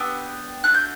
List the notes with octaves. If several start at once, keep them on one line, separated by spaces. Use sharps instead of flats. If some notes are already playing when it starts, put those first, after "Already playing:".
Already playing: B3 D4 G4 E6
A3 D4 F#4 F#6
G6